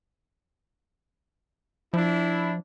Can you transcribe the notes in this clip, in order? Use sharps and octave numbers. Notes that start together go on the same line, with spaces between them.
F3 D4 E4